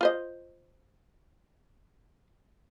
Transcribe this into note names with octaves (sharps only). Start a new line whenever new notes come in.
F4 C5 D#5